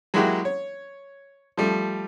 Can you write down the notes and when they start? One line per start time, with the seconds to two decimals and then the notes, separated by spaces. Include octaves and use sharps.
0.14 F#3 G#3 A#3 E4 F#4 G4
0.45 C#5
1.57 F3 G3 A3